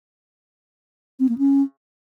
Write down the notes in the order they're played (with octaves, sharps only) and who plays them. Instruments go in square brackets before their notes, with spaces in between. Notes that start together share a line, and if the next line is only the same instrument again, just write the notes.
[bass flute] C4
A#3
C#4